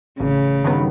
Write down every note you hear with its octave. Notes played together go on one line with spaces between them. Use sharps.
A1 C#3
G2 D#3 F#3 B3